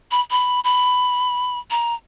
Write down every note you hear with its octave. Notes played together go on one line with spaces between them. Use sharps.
B5
B5
B5
A#5